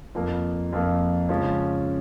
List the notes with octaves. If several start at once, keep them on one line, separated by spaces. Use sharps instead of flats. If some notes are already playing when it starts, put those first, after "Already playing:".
F2 F3 A#3
F2 F3 A#3
C#3 F3 G#3 C#4